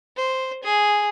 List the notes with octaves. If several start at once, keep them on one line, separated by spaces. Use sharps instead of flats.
C5
G#4